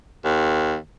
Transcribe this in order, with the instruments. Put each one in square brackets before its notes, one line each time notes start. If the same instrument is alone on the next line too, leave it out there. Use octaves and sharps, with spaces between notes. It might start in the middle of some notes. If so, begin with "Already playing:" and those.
[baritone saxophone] D#2